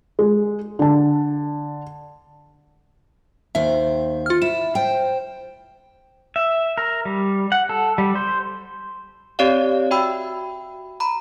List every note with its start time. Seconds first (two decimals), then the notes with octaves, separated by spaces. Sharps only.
0.19 G#3
0.79 D3 A5
3.55 D#2 D#3 C5 E5
4.26 F4 F6
4.42 E4 E7
4.75 C5 G5
6.36 E5
6.78 A#4
7.05 G3
7.52 F#5
7.69 A4
7.98 G3
8.15 C5
9.39 C4 G4 C#5 D5 F5
9.91 F#4 E5 G5 B5 E6
11.00 A#5 B5